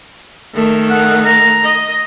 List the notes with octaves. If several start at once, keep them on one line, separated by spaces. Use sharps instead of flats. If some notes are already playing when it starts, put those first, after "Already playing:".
D#3 A3
F#5
A#5
D#5